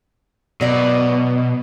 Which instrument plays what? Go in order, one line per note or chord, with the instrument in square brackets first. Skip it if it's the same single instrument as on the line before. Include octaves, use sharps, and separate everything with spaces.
[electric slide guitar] B2 [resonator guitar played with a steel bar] F#3 C#5 D5